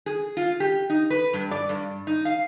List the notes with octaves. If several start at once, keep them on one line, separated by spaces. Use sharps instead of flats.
G#4
F4
G4
D#4
B4
G2
D5
G2
D#4
F5